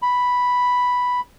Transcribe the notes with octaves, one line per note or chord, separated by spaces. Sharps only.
B5